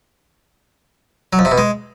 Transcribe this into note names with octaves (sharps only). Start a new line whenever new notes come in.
F#3
F2
C3
B2
G#3